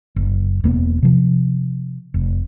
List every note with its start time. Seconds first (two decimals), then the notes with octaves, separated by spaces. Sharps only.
0.16 F#1
0.64 E1 A#3 B3
1.03 C3 F3
2.14 F1